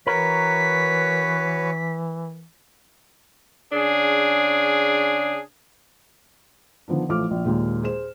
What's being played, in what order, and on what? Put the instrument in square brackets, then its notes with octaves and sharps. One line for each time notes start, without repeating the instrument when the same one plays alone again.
[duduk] E3 [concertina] F#4 B4 C#5 [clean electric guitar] A#4 [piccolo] B6
[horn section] C#3 D4 G#4
[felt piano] D3 D#3 F3 B3 D4
A1 F3 A3 F4 D6 F6
A#1
D#2 A#2 G#3
G#4 C5 E7